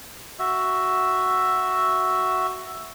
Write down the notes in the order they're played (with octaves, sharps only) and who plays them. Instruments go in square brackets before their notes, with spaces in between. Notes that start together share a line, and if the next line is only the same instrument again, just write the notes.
[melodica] F#4 E5